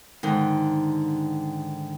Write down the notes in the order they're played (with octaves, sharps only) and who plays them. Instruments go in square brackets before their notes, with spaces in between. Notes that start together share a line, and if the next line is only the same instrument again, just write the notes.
[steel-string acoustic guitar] G#2 D3 D#3